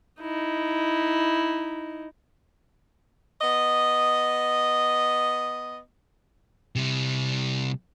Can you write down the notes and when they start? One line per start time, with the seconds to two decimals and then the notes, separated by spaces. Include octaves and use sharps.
0.21 D#4 E4
3.41 B3 D#5
6.76 C3 G3